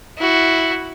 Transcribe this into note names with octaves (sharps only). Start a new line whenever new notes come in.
E4 F#4